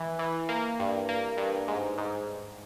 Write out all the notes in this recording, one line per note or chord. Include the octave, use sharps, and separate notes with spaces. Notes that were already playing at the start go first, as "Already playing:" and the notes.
Already playing: E3
E3
A#3
G2
A#3
G2
G#2
G#2